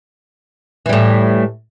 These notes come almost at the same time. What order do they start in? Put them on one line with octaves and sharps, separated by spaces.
E3 G3 A2